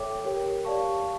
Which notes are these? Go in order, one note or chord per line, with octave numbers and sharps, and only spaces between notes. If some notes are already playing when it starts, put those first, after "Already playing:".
Already playing: A4 C#5 E5 G5 D6
G4 A#4 C#5 G5
G4 D5 F5 A5 C#6